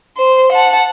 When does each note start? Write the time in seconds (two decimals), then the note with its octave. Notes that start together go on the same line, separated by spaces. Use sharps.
0.17 C5
0.52 F#5 A5